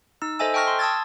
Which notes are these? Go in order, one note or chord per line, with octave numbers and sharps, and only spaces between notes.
D#4 E6
A4 C5 D#5 E5 G#5 E6
G5 A5 C#6 F6 A#6
C6
A5 D#6 E6 G#6 A6